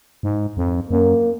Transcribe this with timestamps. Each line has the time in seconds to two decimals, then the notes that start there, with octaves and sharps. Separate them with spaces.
0.23 G#2
0.57 F2
0.91 F#2 A#3